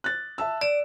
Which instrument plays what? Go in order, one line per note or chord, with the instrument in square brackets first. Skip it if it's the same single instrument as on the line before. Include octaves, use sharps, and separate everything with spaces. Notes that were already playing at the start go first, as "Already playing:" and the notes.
[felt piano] F#6 A6
E5 A5 E6
[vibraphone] D5 [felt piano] E7